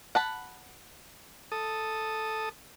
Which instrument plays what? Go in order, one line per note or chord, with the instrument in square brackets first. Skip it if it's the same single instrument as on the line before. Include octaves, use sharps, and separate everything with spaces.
[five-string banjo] F#5 A5 B5
[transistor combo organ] A4 D#6